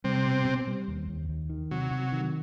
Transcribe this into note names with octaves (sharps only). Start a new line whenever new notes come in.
C3 G3 C4
B2
B2
G3
D#2
D#2
D#2
D#3
C3 F#3
C3
D#3